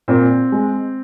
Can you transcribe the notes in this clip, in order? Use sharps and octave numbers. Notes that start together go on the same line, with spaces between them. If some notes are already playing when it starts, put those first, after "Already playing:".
A#2 C4
G#3